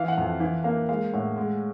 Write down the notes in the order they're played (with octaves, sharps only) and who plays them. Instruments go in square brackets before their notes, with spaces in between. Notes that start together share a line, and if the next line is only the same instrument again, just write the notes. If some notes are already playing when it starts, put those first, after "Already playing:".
Already playing: [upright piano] E3 [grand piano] F5
[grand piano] F#5
[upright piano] F2
[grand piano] F#5
[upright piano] E3 [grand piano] F5
[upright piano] A#3 [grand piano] F5
[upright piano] G#3 [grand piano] F5
[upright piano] A2 [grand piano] F#5
[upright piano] G#3 [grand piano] F#5